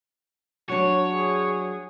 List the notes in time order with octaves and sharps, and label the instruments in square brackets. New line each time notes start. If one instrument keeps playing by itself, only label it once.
[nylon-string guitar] F#3 D4 [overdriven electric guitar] C#5
[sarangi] G#4